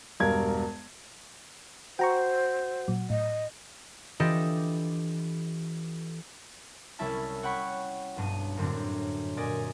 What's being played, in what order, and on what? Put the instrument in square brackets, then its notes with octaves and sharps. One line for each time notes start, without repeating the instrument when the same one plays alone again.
[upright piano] E1 G2 A#4 G#6
[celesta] F#4 F#5 [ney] C5 [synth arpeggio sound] G5 A#5 C#6
[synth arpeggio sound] A#2 F#3
[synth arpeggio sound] A2 [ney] D#5
[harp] E3 D4 F4 G4 A4 D#5
C2 G3 C#4 E4 E5 A5
C#5 F#5 G5 B5 C#6
B1 G2 D#7
F#2 A2 D3 C4 D4
A#2 D5 D#5 G#5